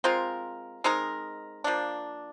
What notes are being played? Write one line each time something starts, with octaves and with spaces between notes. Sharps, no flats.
G#3 C4 F4 A#4
G#3 C4 D#4 A#4
F3 A#3 D4